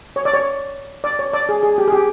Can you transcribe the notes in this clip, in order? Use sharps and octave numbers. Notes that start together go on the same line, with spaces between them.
C#5
D5
C#5
D5
C#5
D5
G#4
G#4
G4
G#4
G4